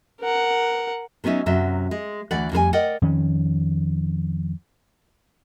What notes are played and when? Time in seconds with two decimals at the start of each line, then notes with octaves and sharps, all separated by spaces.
0.20 A#4 F#5
1.24 F#3 B3 C#4 D#4 E5
1.46 F#2 C3 F#3 E5
1.91 G#3
2.31 D2 E3 D5 F#5
2.52 F2 G3 A#4 G#5
2.73 A#4 D5 D#5 F#5 G5
3.02 F2 D#3 C#4